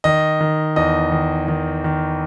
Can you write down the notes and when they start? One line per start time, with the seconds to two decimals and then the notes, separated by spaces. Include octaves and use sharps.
0.04 D#3 D#5
0.40 D#3
0.76 E2 D#5
1.12 D#3
1.48 D#3
1.84 D#3